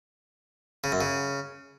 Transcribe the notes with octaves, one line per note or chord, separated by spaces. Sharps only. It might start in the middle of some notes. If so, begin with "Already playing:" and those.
C#3
F#2
C#3